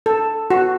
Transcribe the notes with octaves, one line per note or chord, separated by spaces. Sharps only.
A4
F#4